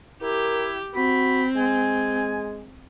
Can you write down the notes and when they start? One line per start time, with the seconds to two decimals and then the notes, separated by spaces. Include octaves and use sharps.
0.22 E4 G4 A#4
0.96 C4 F#4 B5
1.57 G#3 G#5